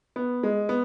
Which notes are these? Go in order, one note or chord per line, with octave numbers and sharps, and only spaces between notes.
B3
G#3
B3